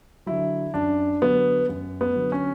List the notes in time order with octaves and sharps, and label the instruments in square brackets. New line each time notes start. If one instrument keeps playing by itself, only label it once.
[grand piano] D3 F#3 E4
F#2 D4
D3 F#3 B3
F#2
B3
D3 F#3
C#4